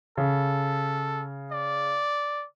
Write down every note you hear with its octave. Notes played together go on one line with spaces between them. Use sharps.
C#3 A4
D5